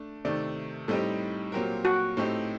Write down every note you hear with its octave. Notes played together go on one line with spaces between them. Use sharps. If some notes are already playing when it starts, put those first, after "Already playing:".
Already playing: A3 D4
C3 D#3 A3 D5
A2 G3 C4 D#4 G4 A4
A#2 F#3 C4 G4 A#4
F#4
A2 A3 C4 D#4 G4